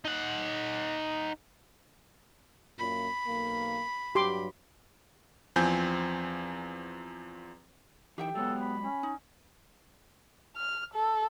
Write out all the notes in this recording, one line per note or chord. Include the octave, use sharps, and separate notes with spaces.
D#4 F#5
F#2 A#2 B5
B1 A#3
G2 F#3 G4 C6 D6
E2 F3 C4 G#5 G6
E3 D#4 G4 E5 G5
F#3 G#3 B3 A4 C#5
B5
C#4
D#4
F6
A4